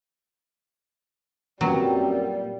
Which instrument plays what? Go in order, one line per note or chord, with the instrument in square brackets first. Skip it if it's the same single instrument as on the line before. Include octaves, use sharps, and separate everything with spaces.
[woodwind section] F#2 C4 [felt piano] A#2 B4 [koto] F#3 [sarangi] G3